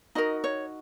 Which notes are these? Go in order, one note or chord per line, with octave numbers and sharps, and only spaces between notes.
D#4 F#4 A#4 D#5
C#5